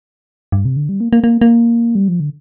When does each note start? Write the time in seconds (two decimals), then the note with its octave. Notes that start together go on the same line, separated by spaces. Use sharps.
0.52 G2
0.65 C3
0.76 D3
0.89 G3
1.00 A#3
1.13 A#3
1.24 A#3
1.42 A#3
1.95 G3
2.08 F3
2.20 D3